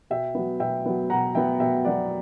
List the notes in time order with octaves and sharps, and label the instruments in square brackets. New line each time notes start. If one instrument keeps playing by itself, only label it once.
[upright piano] B2 E5 G5
F#3 B3
B2 E5 G5
F#3 B3
B2 F#5 A#5
F#3 B3 E5 G5
B2 E5 G5
F#3 B3 D5 F#5